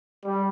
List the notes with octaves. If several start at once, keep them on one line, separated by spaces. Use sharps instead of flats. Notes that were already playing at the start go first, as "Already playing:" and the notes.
G3